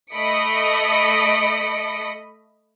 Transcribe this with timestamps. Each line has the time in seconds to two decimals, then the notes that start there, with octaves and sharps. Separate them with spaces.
0.13 A3 D#5 B5 D#6 C#7 D7